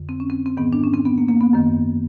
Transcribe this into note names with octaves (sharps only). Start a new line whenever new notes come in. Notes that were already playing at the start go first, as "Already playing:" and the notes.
Already playing: F2 D3
C4
C#4
C4
C4
G#2 D#3 B3
D4
C#4
C4
B3
A#3
A#3
B3
F#2 D#3